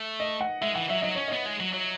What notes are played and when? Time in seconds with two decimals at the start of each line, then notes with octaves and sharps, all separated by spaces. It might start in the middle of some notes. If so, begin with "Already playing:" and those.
Already playing: A3
0.20 D#5
0.41 F#5
0.61 G#3 E5
0.75 E3 F#5
0.90 F#3 E5
1.02 F#3 D#5
1.15 C#4 C#5
1.28 B3 D#5
1.46 G#3
1.60 F#3
1.74 F#3